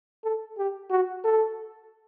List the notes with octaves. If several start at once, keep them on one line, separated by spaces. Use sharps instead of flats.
A4
G4
F#4
A4